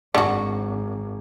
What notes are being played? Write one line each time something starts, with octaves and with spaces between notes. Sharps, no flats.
G#1 D3 F#4